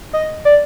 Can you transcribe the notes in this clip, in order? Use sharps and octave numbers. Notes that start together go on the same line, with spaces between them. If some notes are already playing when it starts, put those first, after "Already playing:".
D#5
D5